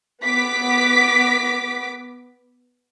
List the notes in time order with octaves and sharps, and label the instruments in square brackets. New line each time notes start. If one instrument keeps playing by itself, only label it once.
[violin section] B3 D6 B6